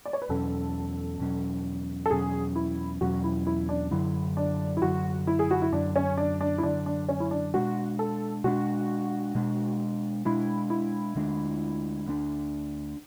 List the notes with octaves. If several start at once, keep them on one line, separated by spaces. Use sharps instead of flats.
D5
C#5
B4
E2 B2 F#3 C#4 A4
E2 B2 F#3 C#4
A4
E2 B2 F#3 C#4 G#4
E4
E2 B2 F#3 C#4 F#4
E4
E4
D4
F#2 D3 F#3 E4
D4
E4
F#2 D3 F#3 F#4
E4
G#4
F#4
E4
F#2 D3 F#3 D4
C#4
D4
D4
E4
F#2 D3 F#3 D4
D4
C#4
E4
D4
B2 G#3 D4 F#4
A4
B2 G#3 D4 F#4
B2 G#3 D4
B2 G#3 D4 E4
E4
D2 D3 G#3 D4
D2 D3 G#3 D4